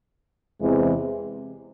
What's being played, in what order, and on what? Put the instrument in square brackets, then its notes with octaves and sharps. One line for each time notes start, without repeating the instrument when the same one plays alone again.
[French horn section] E2 C3 E3 G#3 C4